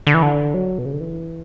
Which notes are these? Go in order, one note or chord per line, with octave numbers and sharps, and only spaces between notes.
D3
E3
D3
F#3
B2
C#3
D3
E3